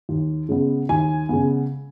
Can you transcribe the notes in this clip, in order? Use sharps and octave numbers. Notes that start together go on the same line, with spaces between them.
D#2
C#3 G#3 B3
D#2 G#5
C#3 G#3 B3